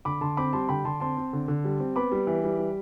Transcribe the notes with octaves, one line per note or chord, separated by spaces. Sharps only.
D3 B5 D6
D3 A5 C6
C4 B5 D6
G3 A5 C6
D3 G5 B5
D3 A5 C6
C4 A5 C6
C4
D3
D3
G3
C4
B3 B5 D6
G3
E3
G3
G3